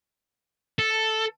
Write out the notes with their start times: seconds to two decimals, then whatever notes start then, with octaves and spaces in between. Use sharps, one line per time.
0.79 A4